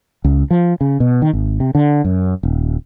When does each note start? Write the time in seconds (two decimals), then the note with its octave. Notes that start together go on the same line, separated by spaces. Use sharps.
0.24 C#2
0.51 F3
0.81 C#3
1.00 B2
1.22 D#3
1.33 G#1
1.60 C3
1.75 D3
2.04 F#2
2.43 D#1